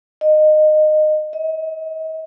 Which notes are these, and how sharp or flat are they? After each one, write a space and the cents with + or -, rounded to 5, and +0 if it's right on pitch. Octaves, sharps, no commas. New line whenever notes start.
D#5 -20
D#5 +40